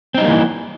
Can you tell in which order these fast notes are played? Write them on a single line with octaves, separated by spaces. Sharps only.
C4 D#4 G3 A#3 E3